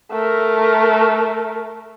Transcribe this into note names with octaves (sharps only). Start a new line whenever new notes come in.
A3 A#4